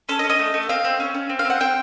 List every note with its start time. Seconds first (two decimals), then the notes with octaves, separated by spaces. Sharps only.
0.09 C#4 A4
0.19 D#5
0.24 C#4
0.29 D#5
0.39 A3
0.54 A3
0.69 C4 F5
0.85 C4
1.00 C#4
1.14 C#4
1.30 C4
1.39 F5
1.45 C4
1.50 F#5
1.60 C4 G5